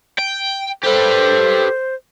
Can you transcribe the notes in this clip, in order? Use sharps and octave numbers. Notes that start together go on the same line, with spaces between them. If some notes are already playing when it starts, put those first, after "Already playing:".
G5
G4 A4 B4 C5